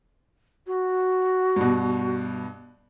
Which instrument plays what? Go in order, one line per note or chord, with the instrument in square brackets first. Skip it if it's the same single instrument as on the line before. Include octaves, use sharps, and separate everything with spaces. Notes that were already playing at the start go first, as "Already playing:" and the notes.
[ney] F#4
[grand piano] G2 B2